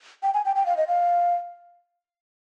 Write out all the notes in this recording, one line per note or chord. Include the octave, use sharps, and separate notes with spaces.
G5
G#5
G5
G5
F5
D#5
F5